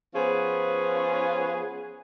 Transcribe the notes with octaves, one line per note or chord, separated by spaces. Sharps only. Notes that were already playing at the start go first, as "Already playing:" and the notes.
F3 B3 C#4 F4 G#4 B4